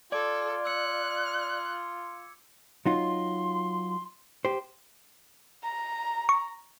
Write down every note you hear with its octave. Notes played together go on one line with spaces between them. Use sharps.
F4 A4 D5 D6 G#6 D7
E6 F#6 C#7
F#3 D#4 F4 C6
G4 C5
A#5
C#6